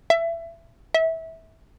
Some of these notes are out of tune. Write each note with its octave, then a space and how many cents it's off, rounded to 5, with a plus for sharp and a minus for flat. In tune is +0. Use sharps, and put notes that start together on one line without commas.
E5 +25
E5 -20